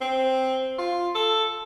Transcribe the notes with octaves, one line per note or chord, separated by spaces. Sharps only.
C4
F4
A4